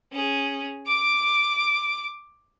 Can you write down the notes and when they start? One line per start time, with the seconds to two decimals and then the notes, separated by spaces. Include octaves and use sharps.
0.12 C#4 G#4
0.87 D6 D7